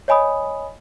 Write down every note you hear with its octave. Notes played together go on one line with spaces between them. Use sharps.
C#5 D#5 G#5 B5 D#6